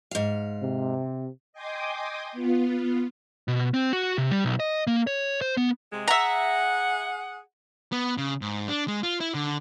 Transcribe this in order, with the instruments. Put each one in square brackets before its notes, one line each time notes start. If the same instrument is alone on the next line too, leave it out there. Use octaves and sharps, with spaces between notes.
[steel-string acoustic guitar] G#2 F5
[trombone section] C3
[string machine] D#5 G5 G#5 C6 D6 D#6
B3 F4
[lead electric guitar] B2
C4
F#4
C3
G3
B1
D#5
A#3
C#5
C5
B3
[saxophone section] C3 G#3
[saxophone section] G#4 F#5 [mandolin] E5 A#5
[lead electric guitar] B3
C#3
G#2
D4
G#3
F4
E4
D3